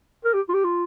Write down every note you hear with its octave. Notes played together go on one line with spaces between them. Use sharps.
A#4
G4
F4
G4
F4